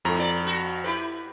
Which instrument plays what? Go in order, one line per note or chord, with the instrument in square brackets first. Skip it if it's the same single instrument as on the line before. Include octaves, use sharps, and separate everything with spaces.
[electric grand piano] F2 A#5 B5 [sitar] G#2 A3
[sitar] B3 D5
F#4
E4 G4 B4